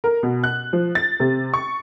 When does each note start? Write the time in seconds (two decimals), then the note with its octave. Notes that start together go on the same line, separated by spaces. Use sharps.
0.04 A#4
0.23 B2
0.44 F#6
0.73 F3
0.95 A6
1.20 C3
1.54 C#6